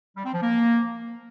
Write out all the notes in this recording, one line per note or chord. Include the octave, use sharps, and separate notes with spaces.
G3
C4
F3
A#3